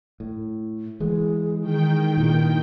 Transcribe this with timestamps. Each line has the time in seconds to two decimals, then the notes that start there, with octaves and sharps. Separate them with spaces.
0.20 A2
1.00 E3 G#3 G#4
1.60 D#3 G#4 G5
2.17 G2 A#2 E4